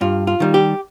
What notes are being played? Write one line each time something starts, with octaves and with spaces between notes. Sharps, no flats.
G2 F4
F4
D#3 G3
G4